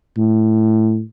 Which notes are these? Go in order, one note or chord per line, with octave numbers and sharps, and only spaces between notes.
A2